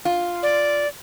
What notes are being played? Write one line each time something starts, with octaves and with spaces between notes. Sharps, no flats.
F4
D5